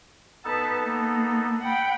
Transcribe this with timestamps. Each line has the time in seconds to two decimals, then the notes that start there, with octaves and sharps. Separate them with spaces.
0.45 B3 D#4 A4 B4 A5
0.83 A#3
1.62 F#5 G5 B5